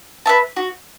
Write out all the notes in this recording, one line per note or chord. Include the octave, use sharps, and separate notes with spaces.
B4 E5 A5
F#4